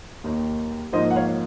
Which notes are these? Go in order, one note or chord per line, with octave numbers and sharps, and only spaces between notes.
D#2 D#3 A#3 D#4
G#2 F3 A#3 D#4 C5 D#5
F#5
C#5 F5